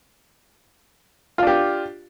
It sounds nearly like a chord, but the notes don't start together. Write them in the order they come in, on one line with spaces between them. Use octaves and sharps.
F4 D4 G4